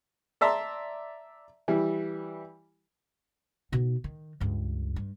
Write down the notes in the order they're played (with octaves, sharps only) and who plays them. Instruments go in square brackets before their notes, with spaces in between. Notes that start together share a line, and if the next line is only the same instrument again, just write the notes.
[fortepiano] D5 E5 A5 A#5 C6
E3 G3
[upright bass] B2 D#4
D#3
C#2 G2
G2